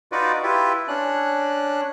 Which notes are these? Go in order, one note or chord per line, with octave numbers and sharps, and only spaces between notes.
D#4 F4 F#4 B4 D5
E4 F4 G4 B4
C#4 D4 F#6